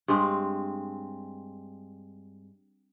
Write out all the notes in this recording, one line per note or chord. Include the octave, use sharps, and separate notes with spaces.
G2 G#3 C4